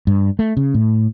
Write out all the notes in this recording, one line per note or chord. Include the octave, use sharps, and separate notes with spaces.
G2
A3
C#3
A2